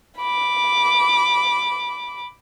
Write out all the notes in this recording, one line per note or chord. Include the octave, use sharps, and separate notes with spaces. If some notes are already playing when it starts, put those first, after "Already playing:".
B5 D6